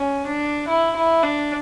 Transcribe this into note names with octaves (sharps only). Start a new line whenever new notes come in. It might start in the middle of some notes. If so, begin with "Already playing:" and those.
Already playing: C#4
D4
E4
E4
D4